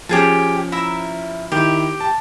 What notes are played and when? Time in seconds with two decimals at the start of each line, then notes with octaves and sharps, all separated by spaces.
0.09 F3 C#4 G4 G#4 A5
0.72 E4 E5 A#5
1.52 D#3 E4 G4
2.01 A5